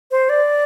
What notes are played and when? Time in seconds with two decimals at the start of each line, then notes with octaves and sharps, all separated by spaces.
0.11 C5
0.29 D5